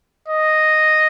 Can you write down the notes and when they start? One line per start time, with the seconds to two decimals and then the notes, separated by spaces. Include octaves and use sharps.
0.28 D#5